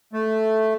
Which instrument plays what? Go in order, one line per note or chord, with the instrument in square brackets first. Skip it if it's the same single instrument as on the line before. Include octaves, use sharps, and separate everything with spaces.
[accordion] A3